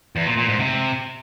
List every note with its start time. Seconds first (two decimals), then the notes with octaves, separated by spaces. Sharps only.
0.16 E2
0.26 A#2
0.37 A#2
0.48 G#2
0.59 C3